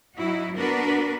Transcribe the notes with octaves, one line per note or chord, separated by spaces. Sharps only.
F#3 D#4 E4 F#4
B3 D4 F#4 A#4 B4